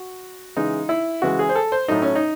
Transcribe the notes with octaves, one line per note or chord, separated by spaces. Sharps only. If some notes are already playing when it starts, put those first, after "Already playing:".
Already playing: F#4
C#3 E3 G#3 D#4
E4
C#3 E3 G#3 F#4
G#4
C5
A4
C5
A2 F#3 A3 D#4
C#4
D#4